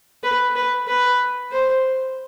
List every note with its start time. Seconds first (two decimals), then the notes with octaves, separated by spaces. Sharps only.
0.23 B4
0.56 B4
0.88 B4
1.52 C5